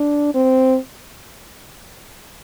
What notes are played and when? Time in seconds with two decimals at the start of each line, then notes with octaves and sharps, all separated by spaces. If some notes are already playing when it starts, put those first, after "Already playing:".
Already playing: D4
0.34 C4